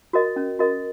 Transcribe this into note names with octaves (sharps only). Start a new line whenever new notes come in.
F#4 A#4 D#5
C#4
F#4 A#4 D#5